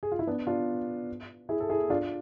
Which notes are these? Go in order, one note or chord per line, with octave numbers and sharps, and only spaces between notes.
G#4
F4
E4
B3 D4
D4 F4
E4 G#4
A4
E4 G#4
D4 F4